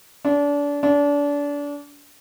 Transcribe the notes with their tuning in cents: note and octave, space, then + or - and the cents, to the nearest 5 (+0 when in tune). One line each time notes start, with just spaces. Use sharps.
D4 -30
D4 -30